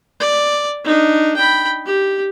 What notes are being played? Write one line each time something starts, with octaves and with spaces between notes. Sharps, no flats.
D5
D4 D#4
G5 B5
G4